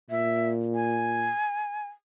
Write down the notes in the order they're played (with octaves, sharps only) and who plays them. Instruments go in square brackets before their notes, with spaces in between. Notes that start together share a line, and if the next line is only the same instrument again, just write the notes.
[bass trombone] A#2 [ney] E5
[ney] G#5